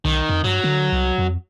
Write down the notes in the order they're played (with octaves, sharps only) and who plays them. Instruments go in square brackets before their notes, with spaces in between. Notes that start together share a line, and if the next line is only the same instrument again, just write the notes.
[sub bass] B1 [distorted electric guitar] D#3
[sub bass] F2
[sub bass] G2 [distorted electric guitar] F#3
[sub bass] D3
C2
F2